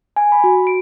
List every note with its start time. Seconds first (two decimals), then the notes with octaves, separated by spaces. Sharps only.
0.16 G#5
0.32 B5
0.44 F#4
0.67 D7